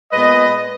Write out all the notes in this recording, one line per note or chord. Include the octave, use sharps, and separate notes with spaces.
A#2 G#3 B3 B4 D#5